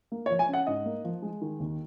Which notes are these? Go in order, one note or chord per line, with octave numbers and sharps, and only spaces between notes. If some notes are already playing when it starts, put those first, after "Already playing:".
A#3
C#5
F3
G#5
C#4 F#5
G#2 D#5
A#3
F3
G#3
D#3
D#2